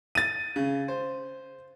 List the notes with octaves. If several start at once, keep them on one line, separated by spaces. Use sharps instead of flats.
A6 D#7
C#3
C5